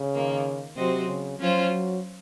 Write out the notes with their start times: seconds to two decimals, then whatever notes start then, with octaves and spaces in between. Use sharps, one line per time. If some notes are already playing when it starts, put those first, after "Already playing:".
Already playing: C#3
0.14 D#3 A#3 F4
0.76 C3 F#3 C4 F#4 C5 D#5
1.07 C#3
1.39 F3 F#3 C#4 F4 C5
1.70 F#3